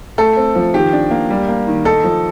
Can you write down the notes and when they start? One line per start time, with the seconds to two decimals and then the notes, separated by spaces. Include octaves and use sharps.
0.18 A3 A4
0.37 C4
0.55 F3
0.74 D#3 G4
0.93 D4
1.11 A#3
1.30 G3
1.48 A#3
1.67 D#3
1.85 D#4 A4
2.04 F3